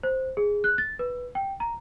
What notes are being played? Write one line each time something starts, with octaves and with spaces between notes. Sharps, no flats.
C5
G#4
F#6
A6
B4
G5
A#5